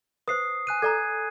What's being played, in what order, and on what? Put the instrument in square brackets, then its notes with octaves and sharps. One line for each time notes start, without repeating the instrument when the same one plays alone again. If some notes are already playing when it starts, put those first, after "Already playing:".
[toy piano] B4 C5 [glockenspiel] D#6 C7
[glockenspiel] G#5 F#6 D#7
[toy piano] A4 D5 A#5 [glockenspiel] G#6